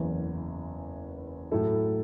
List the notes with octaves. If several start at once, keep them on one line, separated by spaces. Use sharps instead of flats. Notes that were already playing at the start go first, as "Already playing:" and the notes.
Already playing: F#1 E2 E3
A2 F#3 A3 E4 A4